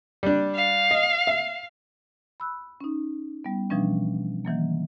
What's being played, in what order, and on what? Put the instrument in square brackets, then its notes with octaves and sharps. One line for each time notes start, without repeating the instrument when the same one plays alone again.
[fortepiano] G3 D4
[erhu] F5
[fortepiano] D#5
E5
[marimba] B5 E6 F#6
C#4 D#4
G3 B3
B2 E3 F3 G3 C#4 D4
D#3 E3 F#3 A#3